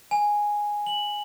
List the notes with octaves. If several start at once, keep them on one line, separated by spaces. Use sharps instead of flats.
G#5
F#7